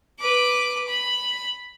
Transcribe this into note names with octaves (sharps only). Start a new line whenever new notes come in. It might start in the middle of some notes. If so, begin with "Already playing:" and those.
B4 D6
B5